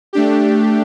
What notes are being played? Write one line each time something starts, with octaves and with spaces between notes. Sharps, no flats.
A3 D4 G4